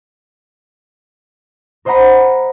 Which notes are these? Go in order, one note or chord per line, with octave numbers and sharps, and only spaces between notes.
A#4 C5 D#5 F#5 A#5 B5